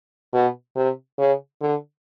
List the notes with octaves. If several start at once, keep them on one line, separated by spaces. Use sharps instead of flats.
B2
C3
C#3
D3